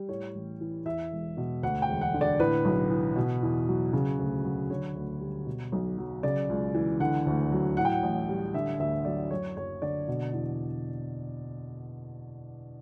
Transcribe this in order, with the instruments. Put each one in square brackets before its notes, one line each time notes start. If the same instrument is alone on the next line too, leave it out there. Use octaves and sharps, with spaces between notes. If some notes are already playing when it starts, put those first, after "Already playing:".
Already playing: [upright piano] G3
A2 C#5
A1
E3
E2 E5
E1
B2
D2 F#5
G5
E1
F#5
D3
D5
A2 B4
B1
E3
B2
E2
F#3
C#3
D2
F#3
D3 C#5
D2
G3
B2
B1
F#3
C#3 D5
C#2
E3
D3 F#5
D2
F#3
A2 F#5
G5
F#5
A1
G3
D3 E5
D2 E5
F#3 D5
F#2 C#5
F#1 C#5
D3 D5
B2
E2